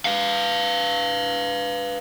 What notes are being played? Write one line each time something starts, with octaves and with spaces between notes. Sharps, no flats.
B4 F5